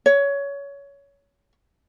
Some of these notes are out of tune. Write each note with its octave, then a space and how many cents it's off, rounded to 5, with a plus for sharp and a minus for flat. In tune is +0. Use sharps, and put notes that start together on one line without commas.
C#5 +20